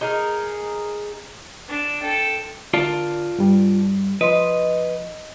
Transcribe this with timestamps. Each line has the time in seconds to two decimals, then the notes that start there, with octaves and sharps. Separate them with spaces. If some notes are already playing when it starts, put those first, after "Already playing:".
0.01 D#4 G#4 A#4
1.68 D4
2.01 A4 G5
2.74 D3 F4 A#4 D5 A5
3.39 G2 G3
4.21 F3 B4 D#5 C6